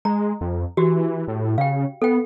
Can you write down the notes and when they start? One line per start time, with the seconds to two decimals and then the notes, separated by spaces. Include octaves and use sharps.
0.05 G#3 A#5
0.41 F2
0.77 E3 F#4 G4
1.28 A2
1.58 C#3 F5 G5
2.02 B3 A4 G5